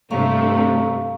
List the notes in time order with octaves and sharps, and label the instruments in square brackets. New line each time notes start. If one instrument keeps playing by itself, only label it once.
[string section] G2 C3 A3 [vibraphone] F5 A#5 C#6